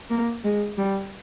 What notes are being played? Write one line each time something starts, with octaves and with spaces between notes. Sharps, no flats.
A#3
G#3
G3